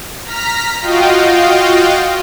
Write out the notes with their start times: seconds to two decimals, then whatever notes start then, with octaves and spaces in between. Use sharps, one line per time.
0.24 A#5 F6 B6
0.82 F4 F#4 D#5 F5 G5